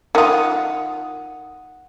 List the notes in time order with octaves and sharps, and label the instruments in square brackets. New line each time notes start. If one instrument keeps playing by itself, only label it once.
[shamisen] D#3 F4 [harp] F#5 D#6